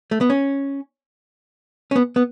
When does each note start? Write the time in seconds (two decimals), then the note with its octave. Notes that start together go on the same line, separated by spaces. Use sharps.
0.11 A3
0.21 B3
0.30 C#4
1.91 C#4
1.96 B3
2.16 B3